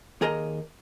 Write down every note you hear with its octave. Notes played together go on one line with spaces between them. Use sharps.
D#2 G#4 A#4 D#5 A#5